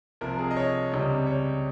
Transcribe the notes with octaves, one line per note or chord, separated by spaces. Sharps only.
C2 C3 F3 A#4
G#4
D#5
C#5
C#2 C3 G3
C#5